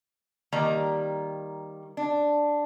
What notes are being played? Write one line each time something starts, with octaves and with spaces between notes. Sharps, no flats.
D#3 G3 A#3 D5 A#5
D4